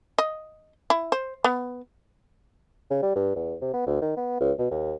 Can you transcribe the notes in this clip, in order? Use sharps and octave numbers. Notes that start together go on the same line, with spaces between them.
D#5
E4
C5
B3
C#3
G3
G2
E2
C3
B3
D2
D#3
B3
C#2
B2
D#2